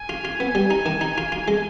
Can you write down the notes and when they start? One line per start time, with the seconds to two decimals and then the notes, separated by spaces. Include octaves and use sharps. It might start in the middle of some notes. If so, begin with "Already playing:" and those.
Already playing: G#5
0.09 F4
0.25 F4
0.40 B3
0.55 G3
0.70 D#4
0.86 D#3
1.01 D#4
1.18 F4
1.32 F4
1.48 G#3